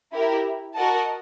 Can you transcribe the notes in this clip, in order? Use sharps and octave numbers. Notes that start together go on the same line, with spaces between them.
E4 G4 A#4
F#4 A#4 D#5 F#5 A5